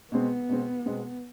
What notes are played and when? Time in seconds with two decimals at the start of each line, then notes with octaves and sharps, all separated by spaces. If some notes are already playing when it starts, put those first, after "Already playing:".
0.12 B2 G#3 B3 C4
0.49 B2 G#3 C4
0.86 B2 G#3 C4